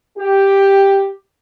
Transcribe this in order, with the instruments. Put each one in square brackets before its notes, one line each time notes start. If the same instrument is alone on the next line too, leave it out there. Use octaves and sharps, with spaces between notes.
[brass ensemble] G4